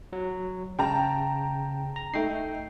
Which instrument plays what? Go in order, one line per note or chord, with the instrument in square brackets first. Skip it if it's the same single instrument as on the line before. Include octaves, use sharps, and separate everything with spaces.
[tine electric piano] F#3
[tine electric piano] C#3 [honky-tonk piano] G5 A5 A#5
[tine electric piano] A#5
[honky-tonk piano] A3 D#4 [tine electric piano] G5 C7